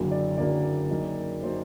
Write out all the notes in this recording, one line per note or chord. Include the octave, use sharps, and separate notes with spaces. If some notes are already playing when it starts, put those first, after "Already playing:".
Already playing: F#1 F#2 D3 F#3 A#3
D5
F#1 F#2 D3 F#3 A#3 D5
F#1 F#2 F#3 A#3 D#4
F#3 A#3 D#4 C5